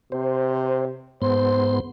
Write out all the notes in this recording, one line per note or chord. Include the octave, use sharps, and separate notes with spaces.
C3 C5
G#2 B3 C5 C6